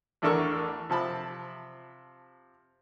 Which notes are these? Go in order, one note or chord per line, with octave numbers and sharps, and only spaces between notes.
A1 E2 D4 A4 A#4 C#6
C3 F3 A5 B5